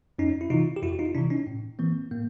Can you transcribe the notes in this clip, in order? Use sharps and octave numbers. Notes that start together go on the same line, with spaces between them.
F2 C#4 D#4
E4
C3 E3 D#4 F4
G4
F2 E4 F#4
D#4 F4
C3 E3 D4 E4
C#4 D#4
A2
E3 A#3 C4
A2 A#3